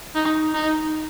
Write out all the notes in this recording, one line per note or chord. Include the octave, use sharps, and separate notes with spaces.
D#4
D#4